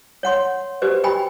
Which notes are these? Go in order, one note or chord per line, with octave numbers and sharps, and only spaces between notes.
C#5 F#5 C6
F#4 G4 B4 C5
G4 G5 G#5 B5